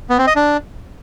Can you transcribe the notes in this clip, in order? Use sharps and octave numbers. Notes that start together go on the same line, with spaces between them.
B3
C4
D#5
D4